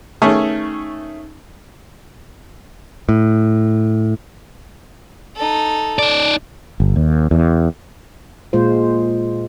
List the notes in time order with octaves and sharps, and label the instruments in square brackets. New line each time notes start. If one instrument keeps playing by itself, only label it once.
[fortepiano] D#3 A3 C#4 G#4
[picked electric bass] A2
[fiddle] D#4 A4
[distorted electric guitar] D#4 D5
[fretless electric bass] G1
D#2
E2
[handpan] A#2 G#3 F4 C5